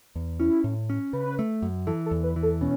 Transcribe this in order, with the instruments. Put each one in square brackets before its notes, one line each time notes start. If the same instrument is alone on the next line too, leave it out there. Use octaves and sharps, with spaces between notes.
[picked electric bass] E2
[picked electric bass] C#4 [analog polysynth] E4
[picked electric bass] A2
C#4
[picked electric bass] C#3 [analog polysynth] B4
[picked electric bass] A3
F#2
[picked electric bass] E3 [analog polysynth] A4
[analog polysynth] A4
[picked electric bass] E2
[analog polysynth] B4
[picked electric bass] E3
[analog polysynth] A4
[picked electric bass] B2 [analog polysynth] C#4